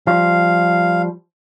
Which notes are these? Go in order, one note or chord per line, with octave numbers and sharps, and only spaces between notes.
F3 G3 F5